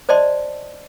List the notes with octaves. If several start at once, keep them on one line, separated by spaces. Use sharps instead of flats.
C5 D5 D#5 A5 C6